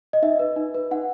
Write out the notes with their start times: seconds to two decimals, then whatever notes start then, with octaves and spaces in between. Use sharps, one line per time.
0.13 D#5
0.22 D#4 E5
0.39 B4
0.56 D#4
0.74 B4
0.91 D#4 F#5